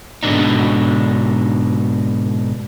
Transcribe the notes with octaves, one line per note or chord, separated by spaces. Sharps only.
G#2 B2 D3 E3 D4 D#4